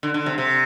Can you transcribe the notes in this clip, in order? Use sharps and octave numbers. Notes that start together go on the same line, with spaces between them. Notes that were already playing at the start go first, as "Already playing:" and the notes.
D3
D3
C3
C3